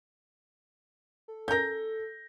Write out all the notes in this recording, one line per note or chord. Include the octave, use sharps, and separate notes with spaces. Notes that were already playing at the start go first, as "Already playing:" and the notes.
A4
C#4 A#4 G6 A#6